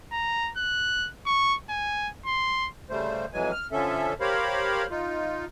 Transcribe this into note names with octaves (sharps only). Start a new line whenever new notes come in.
A#5
F#6
C#6
G#5
C6
C#3 G3 A3 C5
F2 E3 F#3 G#3 G#5
F6
D3 F3 C#4 A4 E5
G4 A#4 C5 C#5 F5 B5
D#4 F4